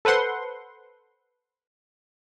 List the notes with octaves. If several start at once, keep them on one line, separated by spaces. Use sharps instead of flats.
A4 B4 C5 F#5 C6